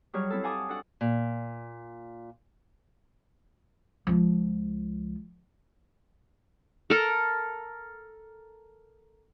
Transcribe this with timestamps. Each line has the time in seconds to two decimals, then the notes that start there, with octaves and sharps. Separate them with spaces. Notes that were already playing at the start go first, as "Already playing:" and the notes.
0.13 F#3 G3 G#4 C#5 F6
0.30 C4 E4 A4
0.43 F5 F#5 G#5 A5 D6 D#6
0.69 D4 F#4 A4 F#5
1.01 A#2
4.07 C#2 F3
6.90 A4 A#4